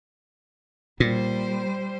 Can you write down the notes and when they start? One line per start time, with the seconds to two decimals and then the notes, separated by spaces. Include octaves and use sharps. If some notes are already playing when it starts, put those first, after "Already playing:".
1.00 A#2 G3 C5